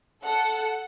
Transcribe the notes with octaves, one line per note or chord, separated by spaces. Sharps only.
A4 F#5